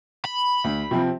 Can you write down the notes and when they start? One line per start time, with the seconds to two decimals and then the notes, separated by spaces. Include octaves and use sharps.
0.25 B5
0.64 D2
0.91 C3 F3 C4